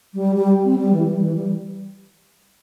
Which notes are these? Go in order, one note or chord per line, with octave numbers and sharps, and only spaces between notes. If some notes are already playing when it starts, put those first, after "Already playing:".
G3
G3
C4
G3
E3
G3
E3
G3